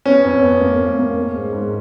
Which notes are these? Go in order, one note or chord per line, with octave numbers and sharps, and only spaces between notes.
B3 C#4
F2
B3
A#3
F2
A#3
A#3
G#2
G#2